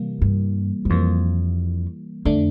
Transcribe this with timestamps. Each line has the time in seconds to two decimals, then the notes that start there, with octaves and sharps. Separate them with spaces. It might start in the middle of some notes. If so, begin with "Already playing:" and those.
Already playing: C3 E3 G3 A#3
0.21 G2
0.85 G2
0.90 F2 E3 G3 A#3
2.25 F2 D3 A3 D4